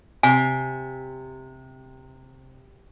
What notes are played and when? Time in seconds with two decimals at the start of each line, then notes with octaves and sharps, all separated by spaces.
0.23 C3 G#5